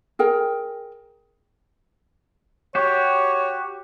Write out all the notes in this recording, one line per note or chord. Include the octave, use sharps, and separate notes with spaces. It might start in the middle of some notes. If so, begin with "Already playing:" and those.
G#4 A#4 G5
F#4 G4 C#5